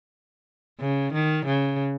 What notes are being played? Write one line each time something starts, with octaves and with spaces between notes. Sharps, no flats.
C#3
D#3
C#3